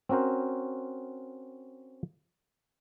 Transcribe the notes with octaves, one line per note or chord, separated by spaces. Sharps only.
C4 C#4 F#4 A#4 C5